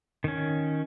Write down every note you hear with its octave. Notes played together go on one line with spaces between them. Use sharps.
D#3 C#4